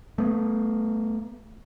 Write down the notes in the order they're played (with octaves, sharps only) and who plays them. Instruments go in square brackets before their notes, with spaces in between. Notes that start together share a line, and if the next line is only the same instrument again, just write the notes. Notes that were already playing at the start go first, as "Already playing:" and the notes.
[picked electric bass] A3 B3